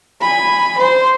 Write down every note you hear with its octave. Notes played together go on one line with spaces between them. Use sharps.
G#5 B5
C5